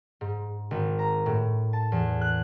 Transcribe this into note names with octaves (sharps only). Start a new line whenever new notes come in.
G#2
G#1
A#5
A2
A5
E2
F#6